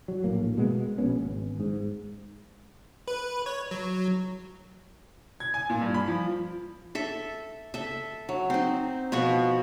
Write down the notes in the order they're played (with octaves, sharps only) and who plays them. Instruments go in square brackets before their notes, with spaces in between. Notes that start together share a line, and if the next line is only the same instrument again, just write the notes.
[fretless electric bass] F#3
A#1 A2 A#3
B2 G#3 B3
A#1 B2 B3 C#4
G#1
G#2
[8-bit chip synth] B4
C#5
F#3
[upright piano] G#6
G#5
A#2
G2
B5
F3
[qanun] A4 E5
A4 E5
F#3
C4 D#4
B2 F3 F#4 C#6